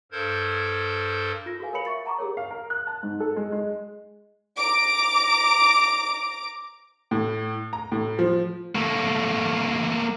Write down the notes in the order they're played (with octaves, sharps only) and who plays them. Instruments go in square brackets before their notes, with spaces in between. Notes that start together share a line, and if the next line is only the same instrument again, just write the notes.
[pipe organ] G2 A4 A#4 C5 G6 G#6
[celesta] F4 A#6
F#4 G#4 A4 B4 F5 G#5
A#4 C#5 F5 B5 C#7 F#7
E5 C#6 A6 C#7
F#5 A5 A#5 C#6 D6
G4 G#4 A#4 C#5
[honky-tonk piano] F5
A#4
F#6
A5
G#2
A4
G#3
G#3
[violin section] A#5 D6 D7
[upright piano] A2
A#5
A2
F3
[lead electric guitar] A3 A#3